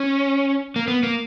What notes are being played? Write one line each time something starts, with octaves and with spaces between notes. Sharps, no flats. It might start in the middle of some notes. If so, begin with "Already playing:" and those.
Already playing: C#4
A#3
B3
A#3